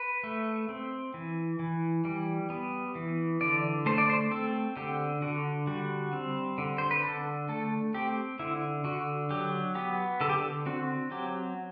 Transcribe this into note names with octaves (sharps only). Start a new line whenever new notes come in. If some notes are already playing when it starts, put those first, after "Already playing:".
Already playing: B4
A3
C4
E3
E3
G3
B3
E3
D3 D5
A3 C5
D5
C5
C4 A4
D3 G4
D3 F#4
G3 F#4
C4
D3
C5
B4
D3 A4
A3 A4
C4 G4
D3 E4
D3 F#4
F#3 G4
B3 G4
D3 A4
G4
A4
C4 F#4
F#3 G4